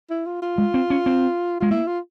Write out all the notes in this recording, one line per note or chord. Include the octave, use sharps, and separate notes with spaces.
E4
F4
F4
G#3
C4
C#4
C4
G#3 F4
A#3 E4
F4